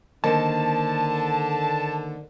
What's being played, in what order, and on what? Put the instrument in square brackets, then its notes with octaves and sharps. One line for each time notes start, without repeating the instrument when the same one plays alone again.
[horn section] D3 [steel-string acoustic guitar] D#3 A#3 C5 [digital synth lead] A5